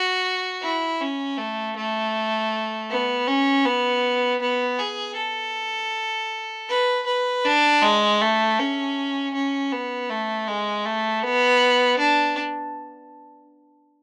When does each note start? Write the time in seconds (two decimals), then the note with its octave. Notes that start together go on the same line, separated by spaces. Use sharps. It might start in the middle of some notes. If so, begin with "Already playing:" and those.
Already playing: F#4
0.63 E4
1.01 C#4
1.38 A3
1.77 A3
2.90 B3
3.28 C#4
3.65 B3
4.42 B3
4.79 G#4
5.17 A4
6.69 B4
7.06 B4
7.45 D4
7.82 G#3
8.21 A3
8.59 C#4
9.34 C#4
9.72 B3
10.10 A3
10.48 G#3
10.85 A3
11.23 B3
11.99 D4